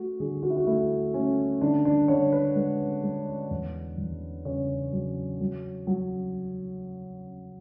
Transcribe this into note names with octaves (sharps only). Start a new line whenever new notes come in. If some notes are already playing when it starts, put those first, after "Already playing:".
Already playing: A3 F#4
D3 G#4
F#4
E4
F#4
A3 E4
A3 C#4
D3 D4
D4
D3 C#5
B4
G#3 B4
G#3
E2
E2
C#3 C#5
F#3
F#3
F#3